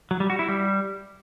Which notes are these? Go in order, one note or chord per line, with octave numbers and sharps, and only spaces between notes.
F#3
G3
F#4
E4
G3